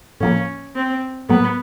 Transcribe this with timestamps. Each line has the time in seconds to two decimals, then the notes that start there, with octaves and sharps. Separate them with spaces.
0.21 A2 F3 A#3 C#4
0.75 C4
1.29 A2 F#3 A#3 B3